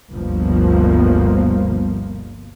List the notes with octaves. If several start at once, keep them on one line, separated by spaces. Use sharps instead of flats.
G1 D2 G2 B2 F3 A#3